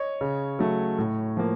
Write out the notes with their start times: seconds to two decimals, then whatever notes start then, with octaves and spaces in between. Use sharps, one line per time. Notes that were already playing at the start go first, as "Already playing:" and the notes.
Already playing: C#5 D#5
0.21 C#3
0.59 F#3 A3
0.98 A2
1.37 F3 A#3